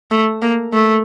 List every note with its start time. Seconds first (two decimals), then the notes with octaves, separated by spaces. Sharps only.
0.11 A3
0.42 A#3
0.73 A3